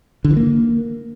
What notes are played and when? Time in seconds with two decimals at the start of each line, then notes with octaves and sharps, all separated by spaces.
0.25 D3
0.31 E3
0.37 A#3